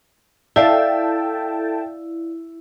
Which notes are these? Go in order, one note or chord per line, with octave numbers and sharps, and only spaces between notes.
E4 A4 D5 E5 F5 G5 A5